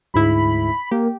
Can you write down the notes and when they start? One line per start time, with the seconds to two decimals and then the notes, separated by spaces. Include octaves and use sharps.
0.14 D2 G#2 E4 B5
0.92 A#3 G4